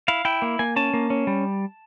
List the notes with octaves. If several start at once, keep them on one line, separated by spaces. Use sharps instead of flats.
E4 F5
E4 G5
A#3
A#3 G#5
C#4 A5
A#3
C#4
G3